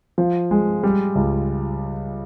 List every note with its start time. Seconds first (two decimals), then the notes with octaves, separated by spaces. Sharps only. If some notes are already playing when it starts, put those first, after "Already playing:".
0.18 F3
0.51 G#3
0.83 G3
1.15 C#2